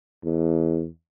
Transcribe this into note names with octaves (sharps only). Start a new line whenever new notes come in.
E2